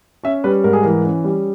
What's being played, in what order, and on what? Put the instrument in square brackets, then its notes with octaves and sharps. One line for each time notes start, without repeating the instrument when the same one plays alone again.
[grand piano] C#4 E5
G3 B4
G#2 A#4
G#4
E3 A#4
C#4
G3